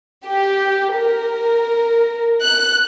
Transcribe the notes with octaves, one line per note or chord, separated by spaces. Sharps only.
G4
A#4
F#6